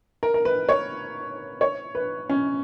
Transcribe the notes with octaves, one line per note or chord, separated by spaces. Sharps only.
A#4
A#4
B4
C#5
C#5
B4
C#4